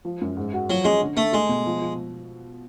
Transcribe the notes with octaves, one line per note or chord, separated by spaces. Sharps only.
F3
F#2
G#2
F#4
F3 F#3
G#3 C#4
D3
D3 A3
G#3 A3
B2
F3
F3